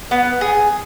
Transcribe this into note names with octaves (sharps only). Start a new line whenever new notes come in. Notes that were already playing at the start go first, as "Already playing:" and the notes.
B3
G#4